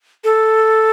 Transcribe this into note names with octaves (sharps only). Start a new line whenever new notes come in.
A4